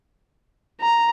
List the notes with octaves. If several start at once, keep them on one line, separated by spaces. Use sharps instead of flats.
A#5